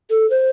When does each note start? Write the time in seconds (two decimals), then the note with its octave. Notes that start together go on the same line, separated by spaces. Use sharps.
0.10 A4
0.30 C5